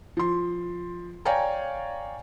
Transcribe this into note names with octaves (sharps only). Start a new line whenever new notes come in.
F3 C6
C#5 D5 F5 G5 G#5 A#5